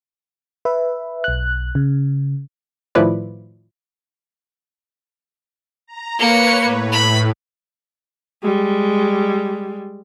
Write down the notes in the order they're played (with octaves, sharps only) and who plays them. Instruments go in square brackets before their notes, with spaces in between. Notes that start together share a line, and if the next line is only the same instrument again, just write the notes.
[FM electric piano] B4 E5
B1 F#6
C#3
[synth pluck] A2 D#3 F3 E4 B4 D5
[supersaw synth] A#5
[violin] A#3 C#7 [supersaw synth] B4 C#5
[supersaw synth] A2
[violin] B5
[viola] G3 G#3